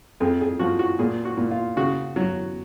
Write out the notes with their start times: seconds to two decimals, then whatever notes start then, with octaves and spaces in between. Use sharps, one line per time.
0.20 F2 G#4
0.41 G#4
0.59 F3 F#4
0.79 F#4
0.99 A#2 G#4
1.25 F#4
1.37 A#2
1.51 F4
1.77 C#3 F#4
2.16 F#3